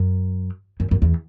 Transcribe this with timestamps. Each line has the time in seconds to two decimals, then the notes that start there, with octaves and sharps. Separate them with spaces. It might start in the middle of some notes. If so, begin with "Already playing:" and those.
Already playing: F#2
0.80 F#2
0.91 F#2
1.02 E2